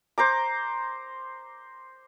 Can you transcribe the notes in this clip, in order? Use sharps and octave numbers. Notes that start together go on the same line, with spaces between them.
C5 A#5 D6